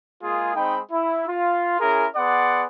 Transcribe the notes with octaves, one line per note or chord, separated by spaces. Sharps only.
G#3 A#3 F4 G#4
G#3 C4 D#4 G5 B5
E4
F4
C#4 E4 G#4 A#4
B3 G#4 D5 F#5 C6